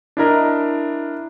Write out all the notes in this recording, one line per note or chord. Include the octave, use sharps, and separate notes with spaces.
D4 E4 A#4 D#5